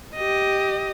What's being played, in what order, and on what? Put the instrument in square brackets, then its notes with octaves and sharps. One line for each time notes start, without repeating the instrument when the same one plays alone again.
[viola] G4 D#5